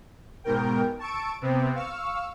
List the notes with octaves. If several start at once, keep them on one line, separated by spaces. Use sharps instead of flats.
G#2 B2 A#4 G5
A5 C#6 E6 D7
C3 B3 C4
F5 C#6 E6